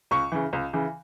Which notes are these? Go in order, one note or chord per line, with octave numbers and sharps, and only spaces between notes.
C#2 C#6
C#3 E3
C#2
C#3 E3